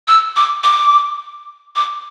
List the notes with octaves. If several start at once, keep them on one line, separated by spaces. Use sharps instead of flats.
E6
D6
D6
D6